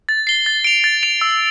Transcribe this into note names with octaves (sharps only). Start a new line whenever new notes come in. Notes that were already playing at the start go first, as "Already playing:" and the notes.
A6
C7 G7
A6
D7 F7
A6
D7 F7
E6